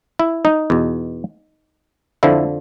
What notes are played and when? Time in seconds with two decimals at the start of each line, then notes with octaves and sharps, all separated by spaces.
0.19 E4
0.45 D#4
0.70 E2 B2
2.23 F2 D3 F3 E4